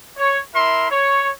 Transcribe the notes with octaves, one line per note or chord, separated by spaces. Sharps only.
C#5
E4 A#4 E5 C6
C#5